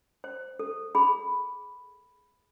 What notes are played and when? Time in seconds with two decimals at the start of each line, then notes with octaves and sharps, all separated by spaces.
0.24 C5
0.59 A4
0.95 G#4 B5